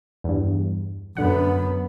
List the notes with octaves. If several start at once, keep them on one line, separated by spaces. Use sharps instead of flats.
E2 G2
F#2 D3 B3 F#5